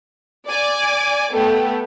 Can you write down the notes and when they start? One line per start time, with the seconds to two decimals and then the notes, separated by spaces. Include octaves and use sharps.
0.47 D5 G#5 D6
1.32 A3 B3 A4 G5